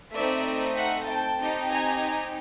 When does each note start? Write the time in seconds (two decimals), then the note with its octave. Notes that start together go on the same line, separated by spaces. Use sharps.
0.15 A3 C4 D#4 D5 E5
0.76 E5 F#5
1.08 G5 A5
1.39 C4 D#4 G4
1.70 G#5 A#5